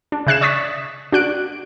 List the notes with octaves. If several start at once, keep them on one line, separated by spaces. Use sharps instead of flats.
D4
C#3 E5 F#6 G#6 C7 E7
D5 C#6 D#6 A6 B6
D4 F#4 F#6 D7